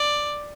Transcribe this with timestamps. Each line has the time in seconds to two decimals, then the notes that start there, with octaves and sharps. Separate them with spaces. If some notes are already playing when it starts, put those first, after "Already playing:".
Already playing: D5